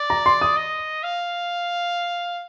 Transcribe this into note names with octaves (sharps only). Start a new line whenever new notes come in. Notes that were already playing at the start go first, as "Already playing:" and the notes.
Already playing: D5
A#5
C6
D#6
D#5
F5